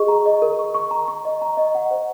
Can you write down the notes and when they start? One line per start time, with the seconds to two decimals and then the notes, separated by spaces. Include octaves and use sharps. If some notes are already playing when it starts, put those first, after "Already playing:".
Already playing: G#4 D#5 C#6
0.08 A#5
0.26 D#5
0.42 A#4
0.59 C#6
0.74 C#6
0.91 A#5
1.08 C#6
1.25 D#5
1.42 A#5
1.57 D#5
1.75 F#5
1.91 C5